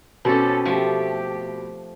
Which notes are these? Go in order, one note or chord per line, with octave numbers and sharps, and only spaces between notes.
B2 C4 C#4 G4 A4
F3 A3 G4